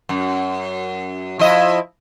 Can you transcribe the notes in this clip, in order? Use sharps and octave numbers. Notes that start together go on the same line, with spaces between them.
F#2
F3 E4 D#5